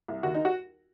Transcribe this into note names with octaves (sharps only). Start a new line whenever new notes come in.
C2
D#2 F#4
D#4
F#4